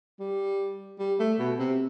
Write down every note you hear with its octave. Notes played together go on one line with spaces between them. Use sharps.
G3
G3
A3
B2
C3